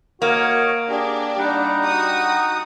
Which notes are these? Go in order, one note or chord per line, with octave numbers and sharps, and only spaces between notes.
A#3 F#4 A#4 C#5 D#5
D4 G4 G#4 A#5
G3 D#4 F#5 A#5
F#4 D#6